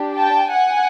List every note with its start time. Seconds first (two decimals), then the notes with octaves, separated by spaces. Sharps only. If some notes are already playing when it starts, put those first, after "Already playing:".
Already playing: D4 G4
0.16 G5 A5
0.51 F#5 G#5